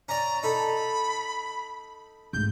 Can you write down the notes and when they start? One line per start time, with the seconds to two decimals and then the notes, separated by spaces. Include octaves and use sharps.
0.09 C#4 D5 A#5
0.43 D#4 A4 B5
2.33 G#2 A3 G6